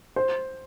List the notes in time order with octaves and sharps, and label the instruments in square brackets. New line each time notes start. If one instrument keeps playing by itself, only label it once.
[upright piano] C5